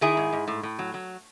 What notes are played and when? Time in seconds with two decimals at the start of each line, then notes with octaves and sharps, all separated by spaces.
0.01 D#3 E4 G#4
0.17 G#2
0.33 G#2
0.48 A2
0.63 A2
0.79 F#3
0.94 F#3